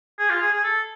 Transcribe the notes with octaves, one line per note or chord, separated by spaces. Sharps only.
G#4
F4
G#4
G#4
A4